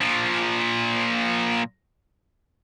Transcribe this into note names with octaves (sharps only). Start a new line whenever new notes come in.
A#2 F3